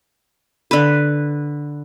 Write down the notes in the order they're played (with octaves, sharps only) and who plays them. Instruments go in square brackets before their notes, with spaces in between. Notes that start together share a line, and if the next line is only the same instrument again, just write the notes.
[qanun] D3 B4